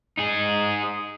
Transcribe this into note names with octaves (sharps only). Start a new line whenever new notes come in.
D#4 G#4